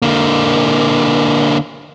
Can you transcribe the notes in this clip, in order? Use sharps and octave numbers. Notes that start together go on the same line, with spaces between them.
D3 A#3